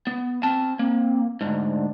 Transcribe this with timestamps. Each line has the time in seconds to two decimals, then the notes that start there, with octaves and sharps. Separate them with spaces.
0.07 B3
0.43 C4 A5
0.79 A#3 C4
1.41 D2 G#2 D4